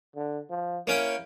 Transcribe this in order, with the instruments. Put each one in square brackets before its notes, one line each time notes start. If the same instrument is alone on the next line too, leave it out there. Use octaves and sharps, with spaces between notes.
[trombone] D3
F3
[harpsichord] A#3 C#4 G5 [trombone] E4